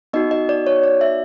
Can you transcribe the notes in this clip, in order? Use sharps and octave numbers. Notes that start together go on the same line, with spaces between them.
B3 D#4 F#4 D#5
D#5
D5
C#5
D5
E5